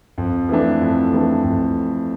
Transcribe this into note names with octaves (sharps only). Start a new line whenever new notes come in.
F2
E3 A3 D4
F2
E3 A3 D4
F2